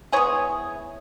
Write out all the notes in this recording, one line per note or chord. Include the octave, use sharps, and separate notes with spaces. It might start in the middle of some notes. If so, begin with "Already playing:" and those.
E3 G#3 B3 G#4 C#5